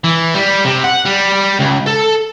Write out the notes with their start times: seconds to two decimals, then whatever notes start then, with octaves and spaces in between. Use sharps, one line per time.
0.04 E3
0.34 G3
0.65 C3
0.84 F#5
1.05 G3
1.59 C#2
1.86 A4